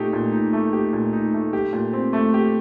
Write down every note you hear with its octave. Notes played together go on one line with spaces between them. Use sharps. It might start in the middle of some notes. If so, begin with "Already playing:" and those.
Already playing: A#2 A3 D#4 G4
A#2
D#4
A3
G4
A#2
D#4
A3
G4
A#2
C4
A3
G4